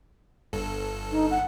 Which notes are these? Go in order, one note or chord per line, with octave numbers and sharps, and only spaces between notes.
G1 G2 A4
D#4
F#5